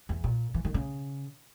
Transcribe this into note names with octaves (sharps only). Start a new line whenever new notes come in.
E2
A#2
E3
D#3
C#3